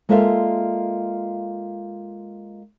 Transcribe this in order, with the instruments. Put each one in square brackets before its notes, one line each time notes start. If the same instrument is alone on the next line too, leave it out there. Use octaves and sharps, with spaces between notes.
[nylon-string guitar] G#3 A#3 F4 A4 E5 F5